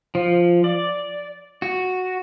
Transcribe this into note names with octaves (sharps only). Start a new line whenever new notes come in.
F3
D5
F#4